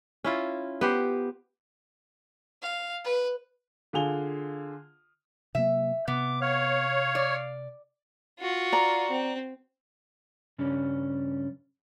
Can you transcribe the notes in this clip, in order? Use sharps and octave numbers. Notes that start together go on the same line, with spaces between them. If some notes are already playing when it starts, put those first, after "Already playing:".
C#4 E4 F4
B3 G4 C5
F5
B4
D3 F4 G#4 G#5 F7 G7
C3 F#3 A#3 E5
C3 B3 D6
C#5 F5
D5
F4 F#4
D5 A#5
C4
G2 C#3 G3 C#4 D4